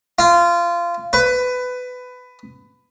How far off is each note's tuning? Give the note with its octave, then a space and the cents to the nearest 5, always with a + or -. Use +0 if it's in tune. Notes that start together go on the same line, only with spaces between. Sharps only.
F4 -20
B4 +20